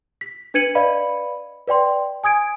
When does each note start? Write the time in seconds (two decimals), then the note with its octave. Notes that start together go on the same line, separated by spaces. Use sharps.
0.21 B6
0.54 D4 B4 G#6 C#7 D#7 F#7
0.75 B4 D5 D#5 F5 B5
1.68 B4 D5 G5 C6
2.24 G#5 D#6 G#6 D7